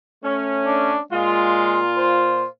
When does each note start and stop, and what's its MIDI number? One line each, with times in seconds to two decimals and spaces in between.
0.24 0.95 57
0.24 0.95 61
0.66 1.00 62
1.12 2.44 46
1.12 1.79 56
1.12 2.44 65
1.98 2.45 72